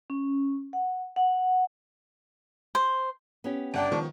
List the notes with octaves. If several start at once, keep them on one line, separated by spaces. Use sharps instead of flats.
C#4
F#5
F#5
C5
B3 C#4 G4
G1 D4 F#5 G5
D#3 F3 C#6